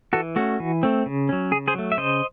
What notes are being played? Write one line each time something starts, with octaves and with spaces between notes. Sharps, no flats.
E3 F#4 A4
A3 C#4 F#4
E3
A3 C4
C#3
F#3 C#4
C#3 G#4
G#4 C5
F#3 A3
E5
C#3 C5 D#5